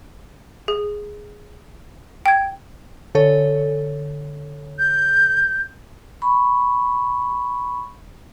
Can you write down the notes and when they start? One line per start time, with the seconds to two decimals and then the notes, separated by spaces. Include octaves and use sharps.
0.68 G#4
2.26 G5 G#6
3.15 D3 A4 C#5
4.79 G6
6.22 B5 C#6